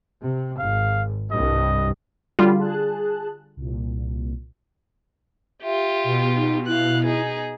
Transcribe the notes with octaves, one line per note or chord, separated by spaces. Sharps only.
C3
G#1 F5
C2 G2 D#5
D3 G3 C#4 F4 F#4 B5
G#4 A5 F#6
C2 A#2
F4 G4 E5
B2
D#4
E4 F5 F#6
D#4 G#4